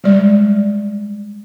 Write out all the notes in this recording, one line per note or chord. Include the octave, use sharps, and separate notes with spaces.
G3 G#3 D5